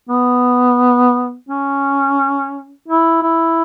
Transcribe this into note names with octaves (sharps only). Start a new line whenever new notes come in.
B3
C#4
E4
E4